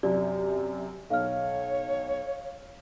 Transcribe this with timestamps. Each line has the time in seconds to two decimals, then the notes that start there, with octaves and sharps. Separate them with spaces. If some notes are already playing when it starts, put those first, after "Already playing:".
0.03 F#2 C3 D5
1.10 B1 C#5 F5 F6